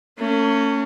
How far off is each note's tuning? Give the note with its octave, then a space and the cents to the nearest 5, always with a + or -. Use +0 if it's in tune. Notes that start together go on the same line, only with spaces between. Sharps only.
A3 +45 C#4 +0